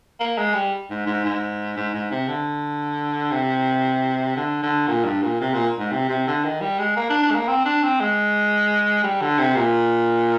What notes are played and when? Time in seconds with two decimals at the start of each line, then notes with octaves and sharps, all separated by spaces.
0.20 A#3
0.38 G#3
0.54 G3
0.90 G#2
1.06 G#2
1.25 G#2
1.77 G#2
1.94 G#2
2.11 C3
2.28 D3
3.31 C3
4.36 D3
4.63 D3
4.87 A#2
5.05 G2
5.23 A#2
5.40 C3
5.53 A#2
5.79 G#2
5.91 C3
6.09 C3
6.27 D3
6.44 D#3
6.61 G3
6.79 G#3
6.96 A#3
7.09 D4
7.22 D4
7.30 G#3
7.35 A#3
7.48 C4
7.65 D4
7.83 C4
8.00 G#3
9.04 G3
9.21 D3
9.38 C3
9.56 A#2